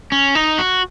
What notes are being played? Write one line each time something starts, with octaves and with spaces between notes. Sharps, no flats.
C#4
D#4
F#4